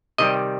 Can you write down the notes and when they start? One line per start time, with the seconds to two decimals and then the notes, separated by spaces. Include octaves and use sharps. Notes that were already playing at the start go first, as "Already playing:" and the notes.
0.18 C3 D#3 G3 D#5